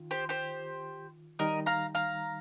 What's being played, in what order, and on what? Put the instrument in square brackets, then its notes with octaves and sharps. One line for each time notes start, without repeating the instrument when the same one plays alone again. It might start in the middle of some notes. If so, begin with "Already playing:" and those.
Already playing: [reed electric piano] D#3 F4
[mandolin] G4 C5
G4 C5
[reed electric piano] D#3 G3 D#4 [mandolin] A#4 D#5
[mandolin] F5 A#5
F5 A#5